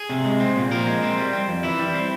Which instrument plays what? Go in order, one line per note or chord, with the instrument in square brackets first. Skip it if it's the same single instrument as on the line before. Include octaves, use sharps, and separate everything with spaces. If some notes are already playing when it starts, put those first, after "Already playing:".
Already playing: [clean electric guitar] G#4
C3
G#3
C4
A#2
F3 A#4
G#3
C4
G3
C4
F2
E3 E4
G3
C4